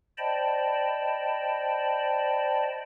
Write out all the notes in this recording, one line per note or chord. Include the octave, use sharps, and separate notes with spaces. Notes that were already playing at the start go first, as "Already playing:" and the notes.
C5 D5 D#5 G5 A5 B5